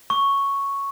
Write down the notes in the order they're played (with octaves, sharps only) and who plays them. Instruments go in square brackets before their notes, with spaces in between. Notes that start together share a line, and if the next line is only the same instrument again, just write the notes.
[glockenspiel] C#6